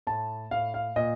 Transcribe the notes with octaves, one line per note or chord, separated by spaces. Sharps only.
A2 A5
A2 F5
F5
A#2 D#5